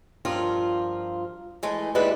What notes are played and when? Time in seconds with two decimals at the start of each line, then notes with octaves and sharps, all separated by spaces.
0.25 G2 F3 F4 A#4
1.63 E3 G#3 A3
1.95 D#2 G3 G#3 E4 B4